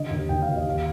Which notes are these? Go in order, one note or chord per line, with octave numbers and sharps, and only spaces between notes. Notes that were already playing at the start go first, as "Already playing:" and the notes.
Already playing: D3 D#5
D#2
D#2 G5
F5
D#2
D#5
D#2 F5